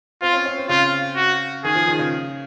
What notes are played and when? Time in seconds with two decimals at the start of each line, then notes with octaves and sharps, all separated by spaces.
0.22 C4 F4
0.33 C#4
0.46 C#4
0.57 C4
0.69 C#3 F4
1.16 F#4
1.64 D#3 G#4
1.76 F3
1.88 D#3
1.99 C#3